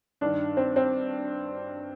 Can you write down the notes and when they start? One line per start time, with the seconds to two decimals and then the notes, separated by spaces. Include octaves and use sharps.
0.21 G2 D#3 D4
0.57 C4
0.76 C4